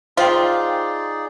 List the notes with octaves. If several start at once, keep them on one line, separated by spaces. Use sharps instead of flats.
D#4 F4 G#4 C5 D5 G5